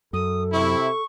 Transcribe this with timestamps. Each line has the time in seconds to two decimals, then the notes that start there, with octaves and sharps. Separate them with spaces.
0.13 F#2 A4 D#6
0.53 C3 E4 C#6